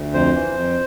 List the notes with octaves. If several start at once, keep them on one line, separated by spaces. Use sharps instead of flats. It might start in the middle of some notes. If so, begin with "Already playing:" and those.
Already playing: D2
F2 C5
E3
F2